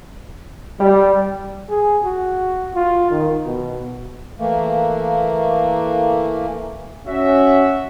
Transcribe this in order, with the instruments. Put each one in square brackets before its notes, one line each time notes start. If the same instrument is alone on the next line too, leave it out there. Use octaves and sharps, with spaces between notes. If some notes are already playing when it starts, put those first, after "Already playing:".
[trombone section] G3
[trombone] G#4
F#4
F4
D#3
B2
[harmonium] E3 A3 A#3
[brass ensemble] C#4 F#4 E5